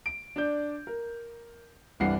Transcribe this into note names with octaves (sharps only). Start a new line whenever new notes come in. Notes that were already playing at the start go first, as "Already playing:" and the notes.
D7
D4 D5 G6
A#4
G1 C2 E3 D4 F#5 C7